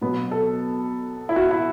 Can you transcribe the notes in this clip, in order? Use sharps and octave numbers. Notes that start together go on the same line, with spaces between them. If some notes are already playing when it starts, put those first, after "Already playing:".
B2 F#3 B3
A4
E4
F#4
E4